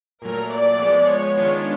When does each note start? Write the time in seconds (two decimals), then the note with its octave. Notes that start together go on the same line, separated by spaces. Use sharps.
0.22 A#2 F#3 A3 A#4
0.51 D5
0.80 F3 G#3 B3
1.08 C#5
1.37 D#3 G#3 B3 D4 F4